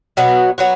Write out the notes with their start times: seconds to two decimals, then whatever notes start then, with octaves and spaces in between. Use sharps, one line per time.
0.17 B2 F#3 B3 F#4
0.58 F#3 B3 F#4